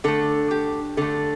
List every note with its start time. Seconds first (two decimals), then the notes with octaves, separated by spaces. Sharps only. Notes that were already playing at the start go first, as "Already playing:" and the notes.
0.04 D3 A3 A4
0.51 G4
0.97 D3 A3 A4